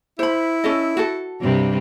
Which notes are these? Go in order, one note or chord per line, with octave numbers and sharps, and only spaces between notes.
E4 C5 B5
C#4 A4 D#5
F#4 A4
G2 C3 G3